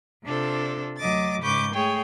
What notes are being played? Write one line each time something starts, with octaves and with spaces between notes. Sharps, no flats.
C3 D4 F4 A4 C5
D2 F#3 D#5 D6 A6
G#2 C#3 B4 C#6 D6 G6
A3 G#4 C#5 G5